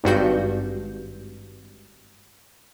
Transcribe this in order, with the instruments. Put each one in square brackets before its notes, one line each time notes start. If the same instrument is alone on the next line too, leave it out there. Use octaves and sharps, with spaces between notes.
[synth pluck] G#1 G2 F#4 G6